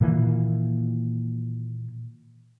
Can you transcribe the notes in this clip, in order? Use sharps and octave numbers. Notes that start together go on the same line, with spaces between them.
A#2 D#3 E3 A#3